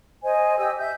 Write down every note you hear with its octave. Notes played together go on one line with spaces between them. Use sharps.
C5 D#5 G#5
G4 D#5 G#5 E6
E5 G6